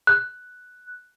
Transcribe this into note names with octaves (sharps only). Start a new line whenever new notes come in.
F#6